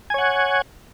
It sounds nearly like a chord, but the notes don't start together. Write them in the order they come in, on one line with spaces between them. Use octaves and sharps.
G#5 C#5 F#5